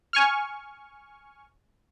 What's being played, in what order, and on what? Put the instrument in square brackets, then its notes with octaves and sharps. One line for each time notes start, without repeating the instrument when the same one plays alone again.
[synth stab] G#5 C#6 F6